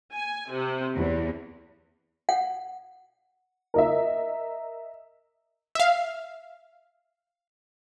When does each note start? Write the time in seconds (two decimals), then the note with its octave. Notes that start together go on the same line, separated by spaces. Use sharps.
0.14 G#5
0.51 C3
0.95 E2
2.29 F#5
3.74 A#4 D#5 E5
5.75 E5 F5